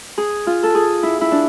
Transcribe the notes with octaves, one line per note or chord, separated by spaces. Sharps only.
G#4
F4
A4
G#4
E4
E4
D4